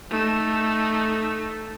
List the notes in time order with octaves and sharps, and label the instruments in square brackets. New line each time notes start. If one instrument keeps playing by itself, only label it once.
[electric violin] A3 D#4